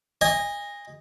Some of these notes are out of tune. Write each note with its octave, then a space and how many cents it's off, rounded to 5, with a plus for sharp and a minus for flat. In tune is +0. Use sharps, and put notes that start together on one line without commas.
D#5 +0 G#5 -30